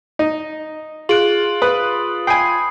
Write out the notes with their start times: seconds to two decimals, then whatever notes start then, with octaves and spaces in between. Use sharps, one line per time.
0.19 D#4
1.09 F4 G#4 F#6 D7 F#7
1.62 B4 D#6
2.27 G5 G#5 B5 D#6 C7